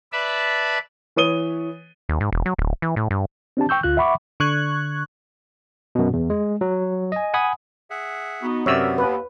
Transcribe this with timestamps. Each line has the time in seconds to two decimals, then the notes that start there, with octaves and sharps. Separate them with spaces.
0.13 B4 D5 E5 A5 B5
1.16 E3 B4 C#5 D#6 D#7 G7
2.09 D#2
2.20 G#2
2.32 E1
2.46 F#3
2.59 D1
2.82 E3
2.96 A2
3.11 G2
3.57 C4 D4 G4 A5
3.69 G5 C#6 E6 G6
3.83 D2 F4 F#6
3.97 E5 F#5 B5 C#6 D6
4.40 D3 C#6 F#6 G#6
5.95 F#2 B2
6.13 E2
6.30 G#3
6.61 F#3
7.12 D#5 G#5
7.34 F#5 G#5 B5 D#6
7.90 G#4 E5 F#5
8.42 B3 D#4 F#4
8.66 F#2 C3 B3 A#4 C#5 D5 E5 E6
8.98 D#2 B4